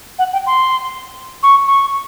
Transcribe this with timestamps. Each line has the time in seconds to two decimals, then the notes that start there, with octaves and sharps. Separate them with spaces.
0.19 F#5
0.33 G5
0.47 C6
1.43 C#6
1.68 C#6